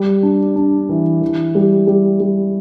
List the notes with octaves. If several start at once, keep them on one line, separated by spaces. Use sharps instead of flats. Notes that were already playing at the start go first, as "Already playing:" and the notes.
Already playing: G3
D4
D4
E3
E3
G3
G3
G3